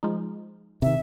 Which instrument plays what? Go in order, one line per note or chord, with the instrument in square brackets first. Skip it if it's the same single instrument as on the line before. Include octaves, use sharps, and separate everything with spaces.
[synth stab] F3 G#3 D#4
[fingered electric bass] C3 D#3 [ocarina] E5